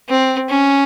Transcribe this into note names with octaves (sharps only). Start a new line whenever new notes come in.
C4
C#4